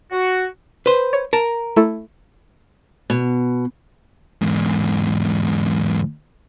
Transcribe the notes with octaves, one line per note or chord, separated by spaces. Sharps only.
F#4
B4 C5
C#5
A#4 A5
A3 E4 A4
B2
E2 G#2